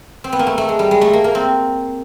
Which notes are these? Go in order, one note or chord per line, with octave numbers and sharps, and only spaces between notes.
C4
B3
A#3
A3
A3
G#3
G3
G#3
A3
A#3
A#3
C4